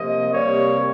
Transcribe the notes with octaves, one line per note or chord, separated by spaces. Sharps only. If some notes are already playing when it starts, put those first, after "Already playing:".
Already playing: C3 F3 A#3 D#5
C3 G3 A#3 C#5